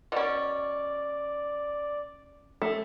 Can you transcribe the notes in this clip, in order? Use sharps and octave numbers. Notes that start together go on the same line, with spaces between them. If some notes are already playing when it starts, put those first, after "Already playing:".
B2 C#4 D5
A3